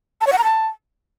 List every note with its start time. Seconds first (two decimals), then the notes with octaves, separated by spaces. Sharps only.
0.21 A5
0.27 C#5
0.32 F#5
0.38 A#5
0.44 A5